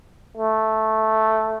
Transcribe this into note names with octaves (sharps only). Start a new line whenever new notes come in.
A3